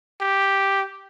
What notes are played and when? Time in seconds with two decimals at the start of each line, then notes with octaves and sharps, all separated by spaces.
0.21 G4